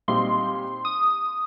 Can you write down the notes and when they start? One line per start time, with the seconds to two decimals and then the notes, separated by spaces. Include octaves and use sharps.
0.08 A#2 G3 C4 D#4 G4 C6
0.85 D#6